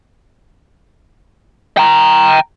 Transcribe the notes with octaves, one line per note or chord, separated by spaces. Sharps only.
G5 A#5